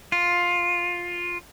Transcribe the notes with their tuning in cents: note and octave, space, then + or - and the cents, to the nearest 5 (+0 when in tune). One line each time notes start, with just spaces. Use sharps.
F4 +10